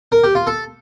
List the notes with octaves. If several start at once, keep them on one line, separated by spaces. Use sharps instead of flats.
A#4
G4
F4
A4